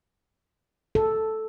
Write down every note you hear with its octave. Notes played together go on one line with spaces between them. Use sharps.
A4